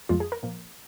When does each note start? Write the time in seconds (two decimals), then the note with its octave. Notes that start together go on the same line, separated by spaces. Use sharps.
0.09 F2 F3 G#3 F4
0.20 G#4
0.32 A#4
0.43 A#2 F3 A#3